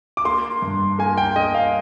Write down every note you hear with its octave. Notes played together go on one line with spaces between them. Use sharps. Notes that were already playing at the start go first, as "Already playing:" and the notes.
D6
A#3 C6
G2
A#3 G#5
G5
A#3 D#5
F5